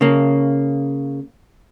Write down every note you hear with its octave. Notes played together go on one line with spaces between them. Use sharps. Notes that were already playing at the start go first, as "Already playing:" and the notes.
C#3 A#3